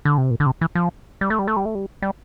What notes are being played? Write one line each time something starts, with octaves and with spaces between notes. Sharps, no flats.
D3
C3
A#2
D3
C3
E3
F3
G3
A3
G3
A3
G3
A3
G3
G3